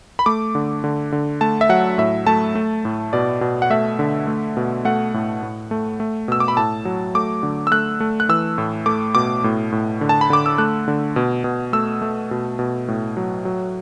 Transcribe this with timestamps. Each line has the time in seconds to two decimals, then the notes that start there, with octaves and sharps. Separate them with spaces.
0.19 B5
0.26 A3 D6
0.55 D3
0.84 D3
1.12 D3
1.41 A3 A5
1.61 E5
1.69 F#3 F#5
1.98 A2 E5
2.27 A3 A5
2.55 A3
2.85 A2
3.13 B2 D5
3.41 B2
3.62 F#5
3.70 A3 E5
3.99 D3
4.27 A3
4.57 B2
4.85 A3 F#5
5.14 A2
5.43 A2
5.71 A3
6.00 A3
6.28 B2 E6
6.40 D6
6.48 B5
6.57 A2 A5
6.85 F#3
7.15 A3 D6
7.43 D3
7.67 E6
7.71 A3 F#6
8.00 A3
8.20 F#6
8.29 E3 E6
8.58 A2
8.86 A3 D6
9.15 B2 D6
9.44 A2
9.72 A2
10.01 D3
10.09 A5
10.21 B5
10.30 D3 D6
10.46 E6
10.58 A3 F#6
10.88 D3
11.16 B2
11.44 B2
11.73 A3 E6
12.02 A3
12.31 B2
12.59 B2
12.88 A2
13.17 F#3
13.45 F#3